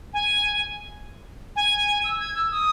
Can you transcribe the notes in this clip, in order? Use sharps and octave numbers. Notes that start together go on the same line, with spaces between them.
G#5
G#5
E6
G#6
E6
D#6